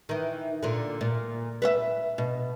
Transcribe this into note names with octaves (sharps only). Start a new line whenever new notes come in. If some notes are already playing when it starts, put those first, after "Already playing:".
D#3 E3
A#2 D3
A#2
B4 C#5 E5
B2